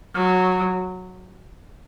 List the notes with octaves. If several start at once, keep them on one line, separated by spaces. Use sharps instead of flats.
F#3